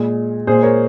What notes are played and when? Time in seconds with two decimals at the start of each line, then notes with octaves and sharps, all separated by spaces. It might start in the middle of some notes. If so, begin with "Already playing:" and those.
Already playing: A#2 G#3
0.47 A#2 G#3 G#4 C5
0.62 A#4 C#5